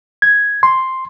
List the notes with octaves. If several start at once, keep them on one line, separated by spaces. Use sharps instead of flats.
G#6
C6